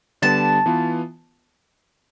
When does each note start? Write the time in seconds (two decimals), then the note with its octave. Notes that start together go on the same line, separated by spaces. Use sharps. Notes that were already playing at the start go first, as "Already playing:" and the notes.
0.22 D3 G3 B3 A5
0.66 E3 B3 F4